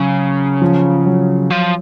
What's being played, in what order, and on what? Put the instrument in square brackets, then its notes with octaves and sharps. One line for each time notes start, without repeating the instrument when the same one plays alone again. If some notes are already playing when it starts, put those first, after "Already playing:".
Already playing: [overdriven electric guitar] C#3 [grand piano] F#3
[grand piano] F3
F#3
[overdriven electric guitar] F3